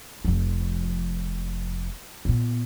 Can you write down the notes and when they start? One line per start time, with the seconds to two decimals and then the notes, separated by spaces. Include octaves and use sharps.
0.25 F1 F3
2.25 A#2 B3